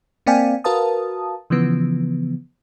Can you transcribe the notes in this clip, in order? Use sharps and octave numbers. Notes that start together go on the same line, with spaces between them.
A#3 C4 D5 F5 G5 G#5
F#4 A#4 B4 F5 A5 D#6
C#3 E3 F3 B3